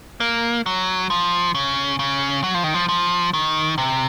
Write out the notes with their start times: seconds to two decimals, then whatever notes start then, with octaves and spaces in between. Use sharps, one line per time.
0.20 A#3
0.66 F#3
1.10 F3
1.55 C#3
1.99 C#3
2.44 F#3
2.54 F3
2.64 D#3
2.74 F3
2.89 F3
3.34 D#3
3.78 C3